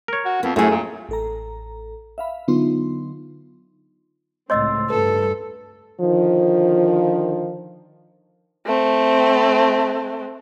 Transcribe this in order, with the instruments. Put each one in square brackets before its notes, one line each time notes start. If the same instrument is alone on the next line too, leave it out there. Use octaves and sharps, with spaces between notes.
[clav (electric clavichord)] A#4 C#5
[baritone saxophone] F#4
[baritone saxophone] F2 [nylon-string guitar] B3
[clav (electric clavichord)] F#2 [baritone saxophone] A2 [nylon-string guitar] A3 G#4
[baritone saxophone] A#2
[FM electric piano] A1 A4 A#5
E5 F5 B5
D3 F#3 B3 D#4 F4 C6
[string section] C#2 A2 C4 [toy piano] C#5 D#5 [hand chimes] C6 E6 A6
[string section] G2 [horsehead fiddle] A4 [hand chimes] B4
[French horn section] D3 D#3 F3
[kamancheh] A3 C4